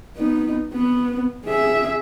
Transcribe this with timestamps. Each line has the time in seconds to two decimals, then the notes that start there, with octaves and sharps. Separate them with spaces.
0.17 B3 D#4
0.73 B3
1.45 G#4 E5